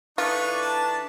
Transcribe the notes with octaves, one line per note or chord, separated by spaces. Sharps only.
E3 D4 D#4 F4 A4 B4 C#6
A5